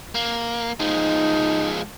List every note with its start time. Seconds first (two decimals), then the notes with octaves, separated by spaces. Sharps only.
0.15 A#3
0.80 F3 G#3 D#4